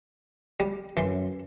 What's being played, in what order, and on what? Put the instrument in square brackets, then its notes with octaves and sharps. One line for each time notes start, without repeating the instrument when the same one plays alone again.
[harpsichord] G3
[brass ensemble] F#2 [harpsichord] E3 C6